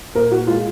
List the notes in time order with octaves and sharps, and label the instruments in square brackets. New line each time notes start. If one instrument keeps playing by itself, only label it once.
[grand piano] A#2 A#4
A#2 F#4
G#3 F4